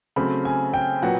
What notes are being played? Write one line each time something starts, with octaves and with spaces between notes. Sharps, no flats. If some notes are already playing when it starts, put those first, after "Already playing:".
C#3 F#3 A3 C4 B5
G#5
G5
A#2 F#3 B3 F#5